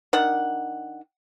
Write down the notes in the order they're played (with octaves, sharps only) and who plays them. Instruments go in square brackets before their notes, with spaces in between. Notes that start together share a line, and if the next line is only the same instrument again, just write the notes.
[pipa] D#3 D4 F#5